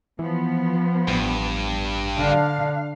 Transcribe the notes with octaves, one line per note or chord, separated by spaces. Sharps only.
E3 F3 B3
A1 G2
D3 D4 F5